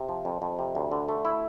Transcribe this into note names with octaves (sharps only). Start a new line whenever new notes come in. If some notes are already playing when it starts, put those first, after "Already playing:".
Already playing: C3
F3
F2
F2
C3
D2
D3
A3
E4